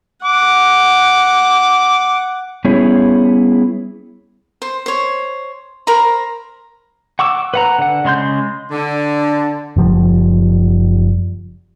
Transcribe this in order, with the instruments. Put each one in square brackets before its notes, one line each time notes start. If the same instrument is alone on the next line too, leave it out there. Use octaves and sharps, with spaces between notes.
[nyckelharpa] F#5 [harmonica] D6
[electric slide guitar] G3 B3 C#4 E4 G#4 C#5
[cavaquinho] C5
C5 C#5
A#4 C5 A#5 B5
[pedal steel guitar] F#5 C#6 D6 E6
B4 F#5 A#5
D3 F#5
C#3 G#3 C6 G6
[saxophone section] D3
[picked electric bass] F#1 F3 G3